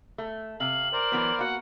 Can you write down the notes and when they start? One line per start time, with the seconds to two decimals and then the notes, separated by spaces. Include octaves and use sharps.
0.18 A3
0.60 C3 F5 F#7
0.93 A#4 C5 D5
1.12 E3 F#3 B3
1.39 A#3 F#4 F#5